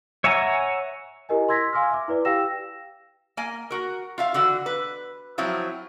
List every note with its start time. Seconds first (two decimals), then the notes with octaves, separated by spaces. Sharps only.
0.24 C#5 E5 F#5 G#5 A#5
1.29 E4 G4 A#4 D#5 G#5
1.49 C6 E6 G#6 A#6 B6
1.73 F5 G#5 C6 D6 E6 F6
1.91 E5 D6
2.08 E4 B4 D5
2.25 G4 F5 G5 E6 A#6 E7
3.37 A#3 G#5
3.71 F#4 A#4
4.18 F4 E5 F5
4.34 D3 E3 F#4
4.66 B4
5.38 F3 F#3 C4 E4 F4